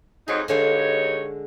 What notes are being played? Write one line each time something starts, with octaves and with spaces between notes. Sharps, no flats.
F2 F#3 D#4 G#4
G2 D3 G#3 D#4 C#5 F5